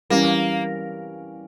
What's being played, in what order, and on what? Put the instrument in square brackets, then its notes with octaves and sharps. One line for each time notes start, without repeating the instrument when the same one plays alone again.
[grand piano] E3 G3 C#4 [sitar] A#3